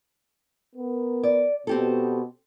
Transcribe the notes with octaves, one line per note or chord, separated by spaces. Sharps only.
B3 A#4
D5
B2 C4 G4 A4